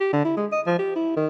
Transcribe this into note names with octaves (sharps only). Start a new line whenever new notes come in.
G4
D3
E4
G#3
D#5
F3
G4
E4
D#3